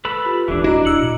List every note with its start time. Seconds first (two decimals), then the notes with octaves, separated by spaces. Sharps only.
0.05 A#3 A4 B4 B5
0.25 F4 G4
0.48 D#1 G#1 E3 D4
0.64 D4 E4 F#4 D#5 A#5
0.85 D#1 E6 C#7 F#7
1.00 A#2 F4